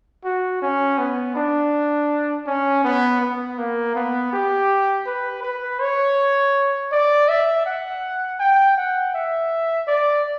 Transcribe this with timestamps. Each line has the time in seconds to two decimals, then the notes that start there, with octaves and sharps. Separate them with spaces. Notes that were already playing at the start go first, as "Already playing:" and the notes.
0.24 F#4
0.62 C#4
0.99 B3
1.36 D4
2.47 C#4
2.84 B3
3.21 B3
3.58 A#3
3.95 B3
4.33 G4
5.06 B4
5.43 B4
5.80 C#5
6.92 D5
7.29 E5
7.66 F#5
8.40 G5
8.77 F#5
9.14 E5
9.88 D5